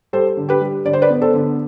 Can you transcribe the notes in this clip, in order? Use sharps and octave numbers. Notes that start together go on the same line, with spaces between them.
G3 A4 C5
D3
G4 B4
G3
D3 D5
C5
B4 D5
B3
A4 C5
D3